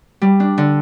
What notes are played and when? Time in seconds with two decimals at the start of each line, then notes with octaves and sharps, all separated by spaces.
0.22 G3
0.40 D4
0.58 D3